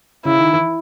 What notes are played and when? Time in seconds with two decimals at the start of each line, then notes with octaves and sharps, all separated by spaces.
0.25 C#3 E4
0.38 D#3
0.53 E3